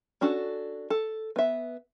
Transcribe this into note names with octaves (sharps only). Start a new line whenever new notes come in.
C#4 D4 F#4 A4
A4
B3 E5